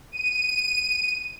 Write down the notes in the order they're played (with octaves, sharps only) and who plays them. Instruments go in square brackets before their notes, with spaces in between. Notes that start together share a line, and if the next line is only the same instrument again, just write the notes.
[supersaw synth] D#7